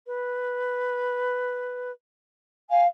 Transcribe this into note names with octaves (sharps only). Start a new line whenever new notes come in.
B4
F5 G#5